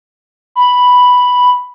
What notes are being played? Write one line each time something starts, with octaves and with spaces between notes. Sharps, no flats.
B5